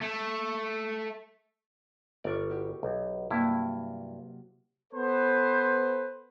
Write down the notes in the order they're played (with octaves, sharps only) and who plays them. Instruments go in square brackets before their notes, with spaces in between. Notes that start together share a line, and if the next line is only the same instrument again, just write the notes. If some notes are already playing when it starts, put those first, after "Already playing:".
[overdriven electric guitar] A3
[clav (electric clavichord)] G1 D5 [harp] A#4 C#6 D6
[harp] E4 F#4 G4
[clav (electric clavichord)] B1
[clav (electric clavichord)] G2 E4 [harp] C3 F#3 A#3
[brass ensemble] B3 A4 B4 C5